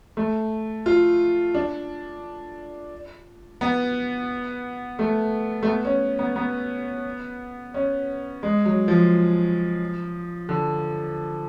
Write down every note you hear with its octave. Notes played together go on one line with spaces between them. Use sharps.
A3
F4
D4
B3
A3
A3
B3
C#4
B3
B3
C#4
G#3
F#3
F3
D3